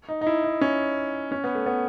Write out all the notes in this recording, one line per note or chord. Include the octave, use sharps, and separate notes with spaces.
D#4
D#4
E4
D#4
C#4
C#4
B3
A3
B3